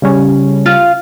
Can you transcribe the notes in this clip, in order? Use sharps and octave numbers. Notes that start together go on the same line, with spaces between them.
C#3 G3 C#4
F4